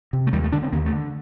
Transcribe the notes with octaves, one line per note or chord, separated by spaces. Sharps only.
C3
A3
D#2 G3
A3
D3 D4
C4
D#2 A#3
A3
D3